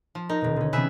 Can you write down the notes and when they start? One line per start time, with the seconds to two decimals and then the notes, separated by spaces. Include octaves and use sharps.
0.15 F3
0.29 D#4 A#4
0.41 D#1 B2
0.56 D3 C#4
0.73 C3 E3 B3 G#4 B4 E5